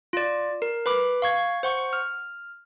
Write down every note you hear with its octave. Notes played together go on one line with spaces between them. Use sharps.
F4 D5
A#4
B4 B5 D6
F5 C#6 G#6
C5 F#5 C#6
F6